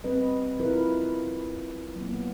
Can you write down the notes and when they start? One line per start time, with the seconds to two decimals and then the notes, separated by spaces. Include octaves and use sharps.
0.04 G3 C4 B4 D#5
0.60 E4 F4 A#4 B4
1.96 F#3 A#3 B3